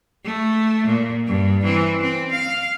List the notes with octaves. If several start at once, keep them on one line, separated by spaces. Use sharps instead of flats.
A3
A#2
G2
E3 C4
C4
F5